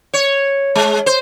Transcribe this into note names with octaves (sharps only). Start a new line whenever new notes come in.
C#5
G#3
C5